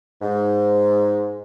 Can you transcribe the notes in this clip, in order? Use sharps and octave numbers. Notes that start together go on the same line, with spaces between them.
G#2